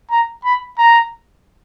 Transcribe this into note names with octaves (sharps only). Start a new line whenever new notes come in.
A#5
B5
A#5